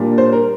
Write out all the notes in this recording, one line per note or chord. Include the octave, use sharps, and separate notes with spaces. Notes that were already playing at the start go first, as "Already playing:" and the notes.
Already playing: A#2 G3 A#3 D4
C5
A#4